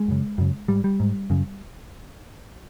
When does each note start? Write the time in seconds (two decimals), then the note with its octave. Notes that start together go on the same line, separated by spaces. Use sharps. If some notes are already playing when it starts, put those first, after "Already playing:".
Already playing: G#3
0.08 F#2 C#3
0.38 F#2 C#3
0.68 G#2 G3
0.84 G3
1.00 G#2
1.30 F#2 C#3